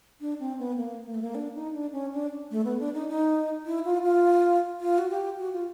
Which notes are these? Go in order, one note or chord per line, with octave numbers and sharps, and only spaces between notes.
D4
C4
B3
A#3
A#3
A3
A#3
D4
D#4
D4
C#4
D4
A3
B3
D4
D#4
D#4
E4
F4
F4
F4
F#4
G4
F#4
F4